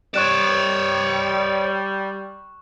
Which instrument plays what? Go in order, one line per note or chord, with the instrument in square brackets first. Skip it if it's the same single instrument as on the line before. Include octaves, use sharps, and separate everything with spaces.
[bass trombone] G3 [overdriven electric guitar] C#5 D5 [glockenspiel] C#6 F#6 E7